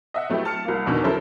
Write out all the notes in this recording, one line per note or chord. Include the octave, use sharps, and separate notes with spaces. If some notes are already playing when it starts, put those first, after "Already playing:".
D#5 E5 F#5
F#3 A3 B3 E4 G4
A5 F6 C#7
C2 A#3
E2 B2 D3 D#3
F#3 C#4 E4 A4 A#4 C5